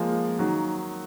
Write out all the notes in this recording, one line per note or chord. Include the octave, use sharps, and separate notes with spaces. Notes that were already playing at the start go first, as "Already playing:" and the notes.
Already playing: F3 G#3 A#3
D#3 F#3